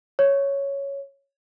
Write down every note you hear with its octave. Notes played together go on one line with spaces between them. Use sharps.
C#5